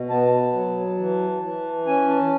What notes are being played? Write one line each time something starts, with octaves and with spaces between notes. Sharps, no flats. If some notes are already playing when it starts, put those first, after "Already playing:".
Already playing: B2
B3 A5
F#3
E3
E3
C#4 G#5
A5